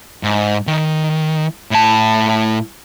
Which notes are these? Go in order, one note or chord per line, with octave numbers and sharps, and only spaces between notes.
G#2
D#3
A2 A5